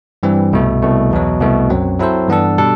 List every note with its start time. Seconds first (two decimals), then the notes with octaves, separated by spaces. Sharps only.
0.23 G2 E3 G3 C4
0.53 C2 B2 A3
0.82 C2 B2 A3
1.11 E2 B2 F#3
1.40 C2 B2 A3
1.70 F#2 F#3 C4
2.00 F#3 C4 E4 A4 C5
2.28 G2 E3 B3 D4 A4
2.58 B2 G3 D4 A4